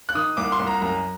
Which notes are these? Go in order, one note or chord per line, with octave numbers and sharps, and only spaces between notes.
F#6
D#3 D#6
C2 D6
C6
C2
A#5
F#2 A#5